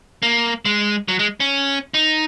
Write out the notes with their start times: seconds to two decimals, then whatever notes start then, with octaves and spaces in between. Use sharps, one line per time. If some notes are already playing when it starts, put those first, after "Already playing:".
0.23 A#3
0.65 G#3
1.08 F#3
1.19 G#3
1.40 C#4
1.94 D#4